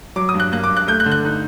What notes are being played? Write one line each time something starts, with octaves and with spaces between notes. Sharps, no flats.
F#3 D6
D#6
G2
F#6
A#3 F#6
D6
G2
F#6
A3 G6
F#6
D3
F#6
D#4